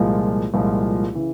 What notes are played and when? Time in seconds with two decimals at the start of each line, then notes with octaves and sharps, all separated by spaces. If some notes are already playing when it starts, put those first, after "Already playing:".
Already playing: C2 A#2 F3 G#3
0.54 C2 A#2 F3 G#3
1.15 C#3 E3